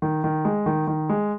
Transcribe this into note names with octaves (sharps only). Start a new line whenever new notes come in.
D#3
D#3
G#3
D#3
D#3
G#3